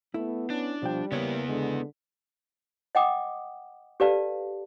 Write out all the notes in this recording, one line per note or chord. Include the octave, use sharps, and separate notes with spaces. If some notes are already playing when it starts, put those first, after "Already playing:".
A3 B3 E4
C#4 D4
B2 F3 G3 G5
C#3 A#3 B3 E4 B4 C#5
D3 G#3
D#5 F#5 G5 D6 D#6
G4 A4 B4 D5 F5 A5